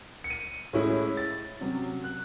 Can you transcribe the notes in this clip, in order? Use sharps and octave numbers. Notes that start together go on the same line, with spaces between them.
C#7
D#7
A2 G#3 C#4 E4
A6
C3 F#3 C#4
F#6